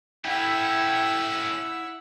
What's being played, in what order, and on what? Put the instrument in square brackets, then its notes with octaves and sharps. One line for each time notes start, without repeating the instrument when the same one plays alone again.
[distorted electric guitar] A3 C#4 [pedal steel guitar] E4 [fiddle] F#5 E6 [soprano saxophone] G5